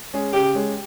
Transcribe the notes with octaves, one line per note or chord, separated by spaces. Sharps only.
G#3 C#4 G#4
C#3 G4
G#3 C#4 G#4